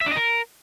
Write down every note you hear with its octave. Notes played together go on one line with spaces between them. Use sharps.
E5
D4
D#5
A#4